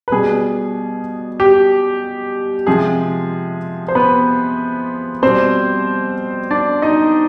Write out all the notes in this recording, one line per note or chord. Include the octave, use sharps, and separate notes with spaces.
B4
B2 G3 G#4
G4
C3 F3 G#3 G#4
C5
B3 B4
B2 G3 C4 C5
D4 D5
D#4 D#5